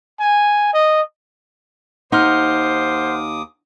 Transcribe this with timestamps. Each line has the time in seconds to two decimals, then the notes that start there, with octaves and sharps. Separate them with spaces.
0.20 G#5
0.74 D#5
2.12 D#2 D#4 C5 F#5 C6 D6 D#6 F6